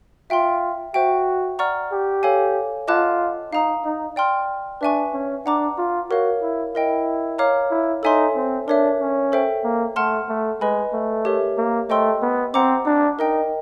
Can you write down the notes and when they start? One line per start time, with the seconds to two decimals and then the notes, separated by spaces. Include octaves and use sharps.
0.30 F4 E5 G5 C6
0.94 F#4 C5 E5 G5
1.59 D5 F#5 A#5 C#6 F6
1.92 G4
2.23 A4 C#5 F5 G#5
2.88 F4 D#5 F#5 A5 D6 F#6
3.52 D#4 F5 A#5 D#6
3.85 D#4
4.16 D5 G5 C6 F6
4.81 D4 B4 E5 G#5 C#6
5.13 C#4
5.46 D4 F#5 A#5 D6
5.78 F4
6.10 F#4 A#4 C#5 F5
6.42 E4
6.74 E4 A#4 D#5 G5
7.39 C#5 F5 A#5 D6 F6
7.71 E4
8.03 D#4 A4 C#5 E5 G#5 C6
8.35 C4
8.68 D4 A#4 C#5 E5
9.00 C#4
9.32 A4 C5 E5 G5
9.64 A#3
9.96 A3 F#5 A5 C6 F6
10.29 A3
10.61 G#3 B4 D#5 G#5 B5
10.93 A3
11.25 G4 A#4 C#5 E5
11.57 A#3
11.89 A3 C5 D#5 G5 C6 E6
12.22 B3
12.54 C4 F#5 A#5 D6
12.86 D4
13.19 D#4 A#4 D#5 G5